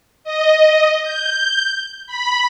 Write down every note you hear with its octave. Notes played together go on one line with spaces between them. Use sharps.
D#5
G6
B5